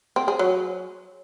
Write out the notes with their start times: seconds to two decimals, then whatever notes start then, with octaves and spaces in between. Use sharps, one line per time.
0.16 C4
0.28 G#4
0.39 F#3